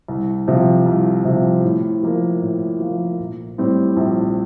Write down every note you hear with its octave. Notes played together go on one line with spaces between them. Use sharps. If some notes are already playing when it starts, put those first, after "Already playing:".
C2
C3 F3
C2
C3 F3
A2
F3 A#3
A2
F3 A#3
A#1
A2 G3 C4
A#1